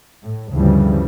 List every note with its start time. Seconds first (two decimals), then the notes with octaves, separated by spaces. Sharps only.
0.23 A2
0.54 D2 G2 C#3 E3 F3 G3